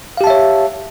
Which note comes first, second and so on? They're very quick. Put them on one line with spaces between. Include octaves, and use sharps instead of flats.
F5 G4 A5 E5 C#5